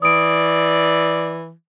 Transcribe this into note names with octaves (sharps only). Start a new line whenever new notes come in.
E3 D5 D#6 D7